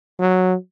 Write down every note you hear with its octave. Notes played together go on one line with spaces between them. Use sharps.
F#3